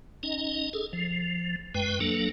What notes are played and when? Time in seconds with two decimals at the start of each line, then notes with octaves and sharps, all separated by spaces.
0.23 C#4 D#4 D#5
0.73 G#4 A4
0.93 F3
1.75 F#2 G#3 B4 G5
2.00 F#3 A#3 D4 A4